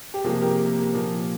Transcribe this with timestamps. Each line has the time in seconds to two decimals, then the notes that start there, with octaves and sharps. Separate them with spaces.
0.14 G4
0.24 C3 F3 A#3 F4 G#4
0.42 G4 A#4
0.93 A#2 F3 A#3